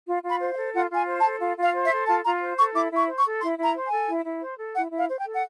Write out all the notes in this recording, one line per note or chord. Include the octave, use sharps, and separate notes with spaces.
F4
F4
B5
C5
F5
A4
F4 F#5
F4
G#5
C5
A5
A4
F4
F4
F5
C5
E5
A4
F4 A5
F4 A#5
C5
A4 C#6
E4 D6
E4
C#6
C5
C#6
A4
E4 C6
E4
A#5
C5
G#5
A4
E4
E4
C5
A4
E4 F#5
E4
F5
C5
G5
A4
F#5